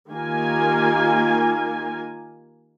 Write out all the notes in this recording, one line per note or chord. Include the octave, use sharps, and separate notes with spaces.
D#3 A#3 F4 G4 A#4 G#5